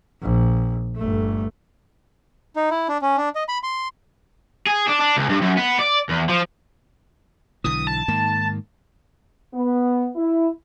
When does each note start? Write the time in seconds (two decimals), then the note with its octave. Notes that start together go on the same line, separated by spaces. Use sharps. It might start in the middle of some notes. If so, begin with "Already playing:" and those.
0.22 A#1
0.97 G1 A3
2.56 D#4
2.71 E4
2.89 D4
3.02 C#4
3.17 D4
3.35 D#5
3.49 B5
3.63 C6
4.66 G#4
4.88 D4
5.01 D4
5.17 C#2
5.29 G2
5.41 F#2
5.57 B3
5.79 D5
6.09 E2
6.29 F3
7.64 B1 D3 E3 D#6
7.87 A5
8.08 G#2 D#3 A#3
9.54 B3
10.16 E4